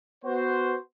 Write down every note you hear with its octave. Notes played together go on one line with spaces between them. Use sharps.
B3 F#4 C5